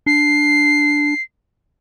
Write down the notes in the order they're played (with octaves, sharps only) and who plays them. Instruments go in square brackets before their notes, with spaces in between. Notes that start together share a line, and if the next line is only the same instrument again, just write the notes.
[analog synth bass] D4 [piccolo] C7